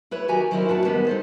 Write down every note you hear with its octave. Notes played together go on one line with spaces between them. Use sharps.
E4 B4 C#5
D#3 F#3 F#4 G4 G#5 A#5
D#3 F#3 C4 E4 F4 A#4
F#2 E3 D4 F#4 F#5 A5
D#3 G3 G#3 B3
D#4 A4 C5